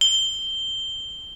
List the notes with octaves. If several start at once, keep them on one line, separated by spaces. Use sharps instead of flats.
G7